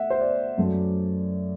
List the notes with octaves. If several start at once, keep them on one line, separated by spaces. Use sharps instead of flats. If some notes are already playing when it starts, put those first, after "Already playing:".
Already playing: A3 E5 F#5
C5
D5
F#2 F#3 A3